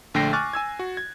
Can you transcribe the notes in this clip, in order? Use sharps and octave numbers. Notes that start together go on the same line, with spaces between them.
A#1 D3 A3 G5 A#6 C7
G#5 C#6 D6 F6 F#6 A6
G#5 E6 G#6
F#4
G#6